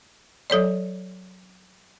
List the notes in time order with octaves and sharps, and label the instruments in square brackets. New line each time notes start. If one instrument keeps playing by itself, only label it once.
[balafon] F#3 A4 C#5 D5